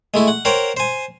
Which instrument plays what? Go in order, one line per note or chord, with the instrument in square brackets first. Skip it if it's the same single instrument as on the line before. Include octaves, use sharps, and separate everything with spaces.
[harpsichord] G#3 A3 E4
F#5
A#4 C5 C#5 F#5 G5
C5 G#5